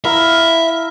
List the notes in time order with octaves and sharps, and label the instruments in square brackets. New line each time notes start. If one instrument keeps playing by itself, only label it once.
[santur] E4 F5 A#5 [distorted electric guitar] E5